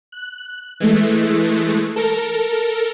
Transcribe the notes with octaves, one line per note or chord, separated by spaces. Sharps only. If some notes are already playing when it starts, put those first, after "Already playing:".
F#6
E3 G#3 A3
A4 A#4